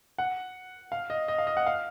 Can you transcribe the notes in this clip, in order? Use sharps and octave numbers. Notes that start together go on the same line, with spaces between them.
F#5
F5
D#5
D#5
F5
D#5
F#5
F5